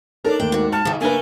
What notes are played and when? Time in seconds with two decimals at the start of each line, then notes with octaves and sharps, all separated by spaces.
0.24 D4 D#4 A4 A#4 C#5
0.40 D#2 A3 G5
0.52 G#2 F#4
0.72 A5 F6
0.85 D#2 G#2 C#3 F#3
1.01 A3 A#3 D4 A#4 B4 G#5